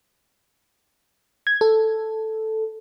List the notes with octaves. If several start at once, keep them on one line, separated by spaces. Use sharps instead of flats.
G#6
A4